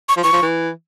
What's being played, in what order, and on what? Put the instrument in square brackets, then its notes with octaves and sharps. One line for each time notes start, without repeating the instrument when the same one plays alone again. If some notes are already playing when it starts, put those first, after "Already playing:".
[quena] C#6
[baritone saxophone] F3
[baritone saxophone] E3 [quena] C#6
[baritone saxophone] F3
E3